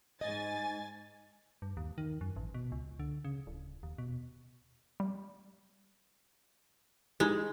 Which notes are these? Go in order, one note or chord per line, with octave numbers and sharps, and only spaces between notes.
G#2 D#5 G#5 A6
G2
D#2
D#3
F#2
A1
B2
C#2
D3
C#3
D1
D#2
B2
G3
G#3 D#4 E4 G4